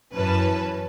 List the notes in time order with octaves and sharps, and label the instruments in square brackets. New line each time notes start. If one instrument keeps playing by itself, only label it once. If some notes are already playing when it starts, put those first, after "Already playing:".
[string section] F#2 E3 C#4 B4 A5